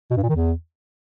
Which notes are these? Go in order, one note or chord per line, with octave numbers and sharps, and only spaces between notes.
B2
G2
A#2
D#3
E2